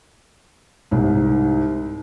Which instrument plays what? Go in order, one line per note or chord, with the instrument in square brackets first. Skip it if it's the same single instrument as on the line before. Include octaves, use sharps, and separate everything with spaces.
[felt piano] C2 G#2